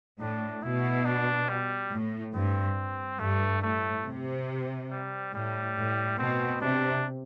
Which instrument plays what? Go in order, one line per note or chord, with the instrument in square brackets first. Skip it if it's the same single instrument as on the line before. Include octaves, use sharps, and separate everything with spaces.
[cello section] A2 [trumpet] D4
[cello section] B2 [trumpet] E4
[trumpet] D4
G3
[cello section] A2
[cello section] G2 [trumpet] C4
[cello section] G2 [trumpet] A3
[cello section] A2 [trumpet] A3
[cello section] C3
[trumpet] G3
[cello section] A2 [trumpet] G3
[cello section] A2
[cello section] B2 [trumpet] C4
[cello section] C3 [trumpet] D4